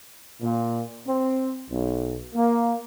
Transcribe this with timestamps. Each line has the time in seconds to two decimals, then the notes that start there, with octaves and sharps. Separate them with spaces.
0.41 A#2
1.06 C4
1.71 B1
2.35 A#3